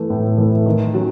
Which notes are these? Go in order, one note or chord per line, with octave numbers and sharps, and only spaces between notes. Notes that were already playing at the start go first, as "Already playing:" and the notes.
Already playing: E3 A3
A2
E3 A3
D#3
F#3 C#4